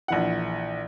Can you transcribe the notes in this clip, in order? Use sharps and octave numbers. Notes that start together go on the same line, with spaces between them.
A#1 E3 F#5